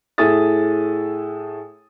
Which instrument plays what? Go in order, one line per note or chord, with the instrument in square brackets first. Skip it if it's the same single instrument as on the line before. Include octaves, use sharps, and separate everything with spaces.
[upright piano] A2 G#4 A4 E5 D#6 A6